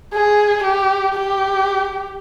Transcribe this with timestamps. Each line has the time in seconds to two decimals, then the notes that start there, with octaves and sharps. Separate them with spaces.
0.14 G#4
0.64 G4
1.15 G4